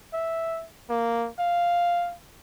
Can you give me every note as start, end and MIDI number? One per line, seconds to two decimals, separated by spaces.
0.13 0.65 76
0.90 1.28 58
1.39 2.14 77